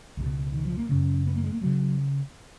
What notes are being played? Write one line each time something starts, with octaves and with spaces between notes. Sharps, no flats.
C#2 B2
D#3
F3
A#3
F#2 C#3 C#4
B3
A#3
G#3
A#3
C#3 F#3